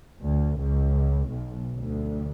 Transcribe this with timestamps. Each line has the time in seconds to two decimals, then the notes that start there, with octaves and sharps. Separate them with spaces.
0.22 D2
0.61 C#2
1.30 B1
1.77 D2